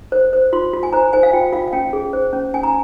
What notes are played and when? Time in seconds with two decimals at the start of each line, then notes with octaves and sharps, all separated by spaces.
0.12 C5
0.33 C5
0.53 F4 C6
0.73 F4
0.83 G#5
0.93 C5 A#5
1.13 C5 G#5
1.23 F5
1.33 F4 G5
1.53 F4 F5
1.68 F5
1.73 C#4 G5
1.93 G#4
2.13 C5
2.33 C#4
2.54 C#4 G#5
2.63 A#5